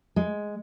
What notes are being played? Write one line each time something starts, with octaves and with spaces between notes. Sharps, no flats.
G#3